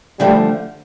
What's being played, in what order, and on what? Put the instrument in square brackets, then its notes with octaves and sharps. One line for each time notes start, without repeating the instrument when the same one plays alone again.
[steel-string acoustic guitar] D3 F3 A3 [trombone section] G3